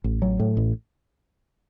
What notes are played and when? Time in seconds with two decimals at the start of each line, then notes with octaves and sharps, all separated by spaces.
0.04 A1
0.22 F#3
0.40 A2
0.57 A1